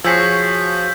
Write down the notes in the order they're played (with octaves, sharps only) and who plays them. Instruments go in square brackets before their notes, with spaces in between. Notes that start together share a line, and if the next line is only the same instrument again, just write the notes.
[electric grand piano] F3 [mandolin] F#4 G#4 C#5 [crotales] E6 G6 B6